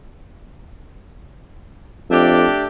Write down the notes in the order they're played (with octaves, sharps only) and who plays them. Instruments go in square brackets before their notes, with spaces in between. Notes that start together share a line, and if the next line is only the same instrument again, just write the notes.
[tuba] F2 [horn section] A3 D4 G4